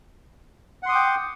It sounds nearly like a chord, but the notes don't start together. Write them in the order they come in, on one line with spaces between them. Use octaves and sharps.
F#5 C6 D#6 D6 G5